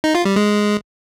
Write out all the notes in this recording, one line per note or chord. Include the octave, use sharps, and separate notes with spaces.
D#4
F4
G3
G#3